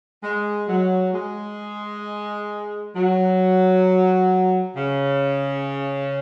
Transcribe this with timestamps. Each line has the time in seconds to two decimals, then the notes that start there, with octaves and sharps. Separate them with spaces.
0.23 G#3
0.68 F#3
1.14 G#3
2.95 F#3
4.76 C#3